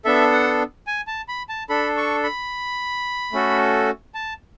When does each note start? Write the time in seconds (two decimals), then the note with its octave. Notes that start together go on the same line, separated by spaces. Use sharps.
0.05 B3 D4 A4 E5
0.32 F#5
0.87 G#5
1.07 A5
1.28 B5
1.49 A5
1.69 D4 A4 B5
1.97 C#6
2.24 B5
3.32 A3 C#4 F#4 A4
4.14 A5